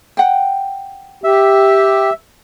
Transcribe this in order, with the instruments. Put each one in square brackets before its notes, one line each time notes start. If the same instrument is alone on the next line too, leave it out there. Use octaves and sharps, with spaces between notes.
[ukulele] F#5 G5
[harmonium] G4 [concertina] E5